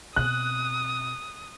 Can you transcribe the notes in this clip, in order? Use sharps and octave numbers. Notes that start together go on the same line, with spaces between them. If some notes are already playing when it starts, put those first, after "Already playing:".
B2 C4 D#6 F#6